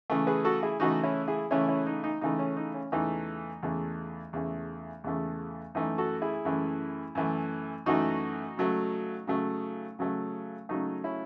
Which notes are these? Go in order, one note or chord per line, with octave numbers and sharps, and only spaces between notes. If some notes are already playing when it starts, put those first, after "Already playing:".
C#3 E3 A3
G#4 B4
F#4 A4
E4 G#4
C#3 E3 A3 D#4 F#4
C#4 E4
E4 G#4
C#3 E3 A3 C#4 E4
C#4 E4
D#4
D#4
C#3 E3 A3 D#4
C#4
D#4
C#4
E2 C#3 E3 A3 D#4
E2 C#3 E3 A3
E2 C#3 E3 A3
E2 C#3 E3 A3
F#2 E3 A3 D#4
F#4 A4
E4 G#4
F#2 E3 A3
F#2 E3 A3
F#2 E3 A3 D#4 F#4
C#3 F#3 A3
C#3 F#3 A3
C#3 F#3 A3
C#3 F#3 A3 D#4
C#4 E4